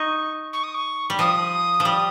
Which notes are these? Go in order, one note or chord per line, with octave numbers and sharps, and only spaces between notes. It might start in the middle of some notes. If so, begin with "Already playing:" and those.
Already playing: D#4 C#6
C#6
D#6
C#6
G3
F3 D#6
F3
G3